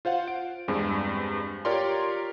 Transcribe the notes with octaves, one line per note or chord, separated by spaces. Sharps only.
F4 C5 F5 F#5
D7
E2 G2 G#3 C4
F4 G4 A#4 C#5 D5 C6